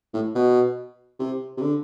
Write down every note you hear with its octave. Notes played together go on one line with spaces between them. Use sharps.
A2
B2
C3
C3
D3